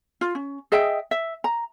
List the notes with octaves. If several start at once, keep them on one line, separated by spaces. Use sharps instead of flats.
F4
C#4
G#4 D#5 E5 G5
E5
A#5